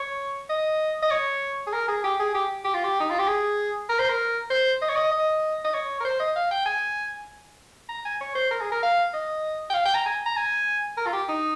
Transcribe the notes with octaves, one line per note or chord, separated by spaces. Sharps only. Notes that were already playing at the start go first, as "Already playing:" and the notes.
Already playing: C#5
D#5
D#5
C#5
G#4
A#4
G#4
G4
G#4
G4
G4
F4
G4
D#4
F4
G4
G#4
A#4
C5
A#4
C5
D#5
C#5
D#5
D#5
D#5
C#5
A#4
C5
D#5
F5
G5
G#5
A#5
G#5
C#5
C5
A#4
G#4
A#4
F5
D#5
G5
F5
G5
A#5
G#5
A#5
G#5
A#4
F4
G4
D#4